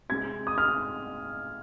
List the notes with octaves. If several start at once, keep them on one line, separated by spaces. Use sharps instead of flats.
C3 G#3 C4 G#6
D#6
F6